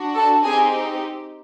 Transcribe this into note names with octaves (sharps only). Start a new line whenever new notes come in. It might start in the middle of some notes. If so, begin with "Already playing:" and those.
Already playing: D4 F#4
A4 A5
C4 D#4 G4 G#4 G#5